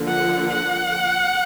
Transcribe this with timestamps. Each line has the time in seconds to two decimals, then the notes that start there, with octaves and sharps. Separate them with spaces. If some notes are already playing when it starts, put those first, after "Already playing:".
Already playing: D3 F3 A#3
0.09 F#5
0.49 F#5